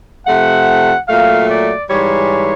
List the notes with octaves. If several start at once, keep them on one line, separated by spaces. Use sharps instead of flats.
C3 F3 A3 F#5
A#2 F#3 A3 F5
D5
G#2 E3 G3 C#5